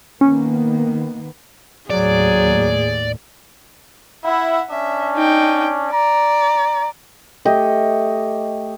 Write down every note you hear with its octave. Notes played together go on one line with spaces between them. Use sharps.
D#3 A#3 B3 C#4
D#2 A2 F#3 G#4 D5
E4 E5 F#5
C#4 D4 E5
D#4 G5
D5 A#5
A3 G4 D#5